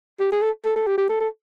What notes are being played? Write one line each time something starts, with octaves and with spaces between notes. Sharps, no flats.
G4
G#4
A4
A4
A4
G4
G4
A4
A4